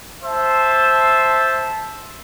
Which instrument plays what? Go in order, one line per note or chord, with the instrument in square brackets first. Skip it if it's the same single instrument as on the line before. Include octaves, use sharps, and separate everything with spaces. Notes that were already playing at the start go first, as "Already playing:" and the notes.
[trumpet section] C5 E5 A5